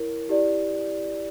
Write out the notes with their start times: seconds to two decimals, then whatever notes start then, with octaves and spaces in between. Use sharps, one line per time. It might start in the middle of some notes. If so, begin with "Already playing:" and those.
Already playing: E4 A#4 C#5
0.29 E4 G4 D5